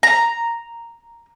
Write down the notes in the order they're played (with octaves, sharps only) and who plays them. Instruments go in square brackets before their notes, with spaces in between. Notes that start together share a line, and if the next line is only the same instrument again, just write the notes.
[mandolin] A#5